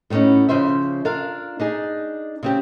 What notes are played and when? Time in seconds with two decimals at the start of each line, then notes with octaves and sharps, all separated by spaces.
0.10 A2 G3 B3 C#4 D#4
0.49 C#3 F3 C5 E5
1.05 D4 F4 A#4 F5
1.60 D4 D#4 G#4
2.43 C#3 C4 G4